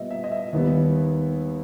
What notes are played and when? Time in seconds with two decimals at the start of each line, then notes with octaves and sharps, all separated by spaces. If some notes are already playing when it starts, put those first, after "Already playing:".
Already playing: A#2 G3 B3 D#5 E5
0.11 E5
0.24 D#5
0.32 E5
0.53 D#2 D#3 G3 B3